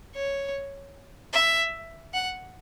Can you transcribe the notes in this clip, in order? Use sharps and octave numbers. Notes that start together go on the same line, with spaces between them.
C#5
E5
F#5